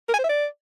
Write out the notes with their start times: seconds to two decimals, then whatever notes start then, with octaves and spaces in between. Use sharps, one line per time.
0.09 A#4
0.14 G#5
0.19 C5
0.24 E5
0.29 D5